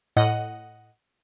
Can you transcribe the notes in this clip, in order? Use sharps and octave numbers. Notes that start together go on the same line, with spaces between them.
A2 D#5 F#5